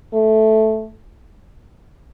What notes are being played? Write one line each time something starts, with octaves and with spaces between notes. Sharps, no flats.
A3